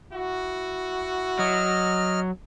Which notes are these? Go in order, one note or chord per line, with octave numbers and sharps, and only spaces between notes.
E4 F#4
F#3 D#5 F6